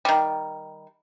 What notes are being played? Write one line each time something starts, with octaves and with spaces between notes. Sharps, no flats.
D#3 G3